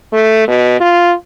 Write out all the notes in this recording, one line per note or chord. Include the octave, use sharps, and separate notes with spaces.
A3
B2
F4